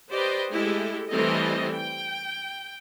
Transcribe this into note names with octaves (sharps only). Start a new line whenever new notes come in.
G4 B4 C5 D5 D#5 G5
G#3 A3 E4 G4 A4
E3 G3 A3 C4 A4 D#5
G5